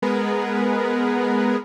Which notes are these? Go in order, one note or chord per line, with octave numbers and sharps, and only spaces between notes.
G#3 B3 G#4 A#4 B4